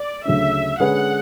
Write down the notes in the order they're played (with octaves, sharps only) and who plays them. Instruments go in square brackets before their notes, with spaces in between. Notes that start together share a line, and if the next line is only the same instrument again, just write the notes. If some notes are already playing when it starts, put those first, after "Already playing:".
Already playing: [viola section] D5
[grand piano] D2 C#3 F#3 A3 C#4 [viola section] E5
[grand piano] D3 G#3 C#4 G#4 B4 [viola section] F#5